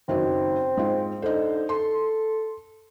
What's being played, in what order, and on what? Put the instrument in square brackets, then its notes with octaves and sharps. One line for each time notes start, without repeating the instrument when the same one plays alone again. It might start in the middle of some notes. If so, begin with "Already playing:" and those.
[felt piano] F#1 D#3 F#3 [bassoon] C4
[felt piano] G#2 G#3 F4
[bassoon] D3 [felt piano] D#4 C5
[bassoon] A4 [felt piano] C6